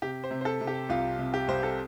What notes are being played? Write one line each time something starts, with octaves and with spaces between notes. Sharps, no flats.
C3 G4
C5
C3
C5
A4
C3
G4
C2 F4
C3
G4
C2 C5
A4